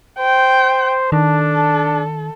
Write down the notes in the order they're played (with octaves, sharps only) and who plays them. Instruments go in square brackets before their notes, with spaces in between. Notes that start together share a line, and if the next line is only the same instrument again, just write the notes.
[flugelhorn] C5 [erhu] G5
[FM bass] D#3 [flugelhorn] D4 [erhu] A4